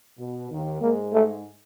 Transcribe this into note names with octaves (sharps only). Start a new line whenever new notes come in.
B2
D#2 D#3
G#2 G#3 A#3
A3